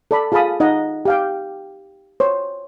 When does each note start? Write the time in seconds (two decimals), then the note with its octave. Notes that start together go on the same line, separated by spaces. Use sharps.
0.11 A4 D5 B5
0.32 F4 G#4 F5 A5 B5 D#6
0.60 D#4 D#5 F#5
1.05 G4 F5 G5
2.20 C5 C#5